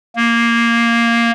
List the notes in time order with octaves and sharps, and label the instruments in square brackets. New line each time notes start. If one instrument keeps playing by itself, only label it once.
[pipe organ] A#3